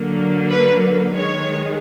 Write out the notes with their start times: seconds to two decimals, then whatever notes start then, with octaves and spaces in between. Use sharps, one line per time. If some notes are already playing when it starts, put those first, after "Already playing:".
Already playing: D3 F#3 A#3
0.49 B4
1.15 D#3 G#3 C#5